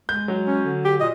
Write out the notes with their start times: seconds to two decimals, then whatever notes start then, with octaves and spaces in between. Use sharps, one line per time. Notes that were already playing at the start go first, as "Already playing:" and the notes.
0.09 G#3 G6
0.28 F#3
0.47 C#4
0.64 D3
0.85 G4
1.00 A#2 D#5